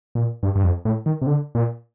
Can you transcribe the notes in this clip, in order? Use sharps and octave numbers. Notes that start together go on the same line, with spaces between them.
A#2
G2
G2
F2
A2
D#3
C3
D3
A#2